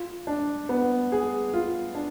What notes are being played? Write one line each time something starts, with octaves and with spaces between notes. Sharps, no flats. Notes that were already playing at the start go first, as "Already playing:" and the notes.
Already playing: F4
D4
B3
G#4
F4
D4